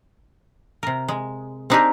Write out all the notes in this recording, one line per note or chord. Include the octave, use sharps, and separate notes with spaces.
C3 A#4
G#3
C4 D4 D#4 G4 G#4 A#4